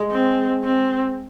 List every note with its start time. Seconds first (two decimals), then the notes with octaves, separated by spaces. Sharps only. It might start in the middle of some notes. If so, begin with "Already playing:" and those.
Already playing: G#3
0.11 C4
0.63 C4